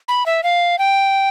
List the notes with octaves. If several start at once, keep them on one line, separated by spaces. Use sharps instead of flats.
B5
E5
F5
G5